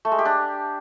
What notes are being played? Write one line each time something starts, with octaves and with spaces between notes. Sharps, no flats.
A3
G#3
G4
D4